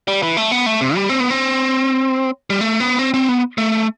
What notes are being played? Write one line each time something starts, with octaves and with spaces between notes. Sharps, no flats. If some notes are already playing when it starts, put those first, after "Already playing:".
G3
E3
A3
B3
A3
C3
G3
C4
B3
C4
G3
A3
B3
C4
C4
B3
A3